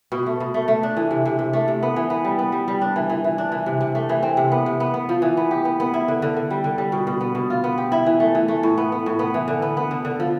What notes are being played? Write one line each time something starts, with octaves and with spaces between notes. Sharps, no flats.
B2
A3
B2
A3
A3
D4
E3
C3
C3
C3
A3
C3
B3
E3
B3
G3
B3
G3
G3
D4
E3
E3
E3
D4
E3
C3
C3
A3
E3
C4
C3
B3
C3
B3
B3
F3
E3
B3
G4
B3
B3
E4
D3
D3
D3
G3
D3
G3
B2
B2
B3
B2
F4
B3
G4
E4
E3
A3
E3
A3
A2
B3
B3
A2
B3
E3
D3
B3
B3
D3
D3
F3